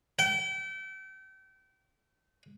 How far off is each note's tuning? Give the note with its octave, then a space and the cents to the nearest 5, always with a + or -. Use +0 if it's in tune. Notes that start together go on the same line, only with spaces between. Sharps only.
G5 -35